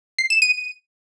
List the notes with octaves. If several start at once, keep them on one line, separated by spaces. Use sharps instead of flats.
C7
E7
D#7